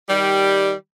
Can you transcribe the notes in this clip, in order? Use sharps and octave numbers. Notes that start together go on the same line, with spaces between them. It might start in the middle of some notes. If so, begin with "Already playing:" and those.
D#3 G3